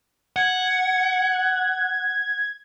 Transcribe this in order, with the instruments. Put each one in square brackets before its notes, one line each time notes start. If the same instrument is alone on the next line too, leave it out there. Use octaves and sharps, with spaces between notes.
[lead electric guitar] F#5 [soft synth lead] G#6